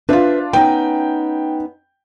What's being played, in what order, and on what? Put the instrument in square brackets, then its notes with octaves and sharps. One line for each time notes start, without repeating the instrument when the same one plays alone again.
[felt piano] D4 F4 [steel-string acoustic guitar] B4 C5 E5
[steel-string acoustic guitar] B3 C#4 D#4 [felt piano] G5